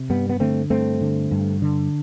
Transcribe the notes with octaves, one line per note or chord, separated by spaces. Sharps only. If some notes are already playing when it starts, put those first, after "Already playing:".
Already playing: C3
G2 G3 B3
B3
D3 A3 C4
G2 A3 C4
D3
G2
D3